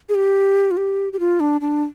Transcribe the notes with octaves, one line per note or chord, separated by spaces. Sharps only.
G#4
G4
F4
G4
G4
F4
D4
D4